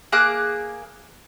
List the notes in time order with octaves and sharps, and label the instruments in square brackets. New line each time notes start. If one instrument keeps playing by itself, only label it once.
[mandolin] A#3 G#4 D6 F#6